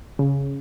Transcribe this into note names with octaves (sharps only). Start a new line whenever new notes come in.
C#3